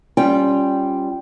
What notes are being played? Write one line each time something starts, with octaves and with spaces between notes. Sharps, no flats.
G3 C#4 F4 G5